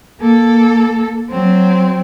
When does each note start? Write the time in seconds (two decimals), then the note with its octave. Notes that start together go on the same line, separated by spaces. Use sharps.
0.20 A#3 A4
1.30 F#3 C4